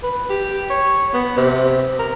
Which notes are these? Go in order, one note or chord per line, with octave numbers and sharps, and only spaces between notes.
B4
G4
C#5
B3
C3
A#4